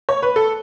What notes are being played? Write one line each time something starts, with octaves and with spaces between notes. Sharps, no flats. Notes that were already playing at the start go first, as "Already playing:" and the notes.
C#5
B4
A4